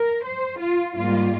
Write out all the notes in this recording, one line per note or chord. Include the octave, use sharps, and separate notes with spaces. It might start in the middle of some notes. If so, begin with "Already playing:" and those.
Already playing: A#4
C5
F4
G#2 G3 A#3 F4